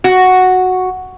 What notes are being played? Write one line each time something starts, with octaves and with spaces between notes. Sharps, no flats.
F#4